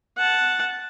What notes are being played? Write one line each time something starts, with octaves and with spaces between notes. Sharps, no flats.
F#5 A5